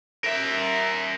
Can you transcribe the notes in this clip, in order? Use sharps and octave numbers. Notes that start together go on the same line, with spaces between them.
A#4 E5